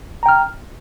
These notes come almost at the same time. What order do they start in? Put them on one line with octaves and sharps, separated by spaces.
A#5 G5 F6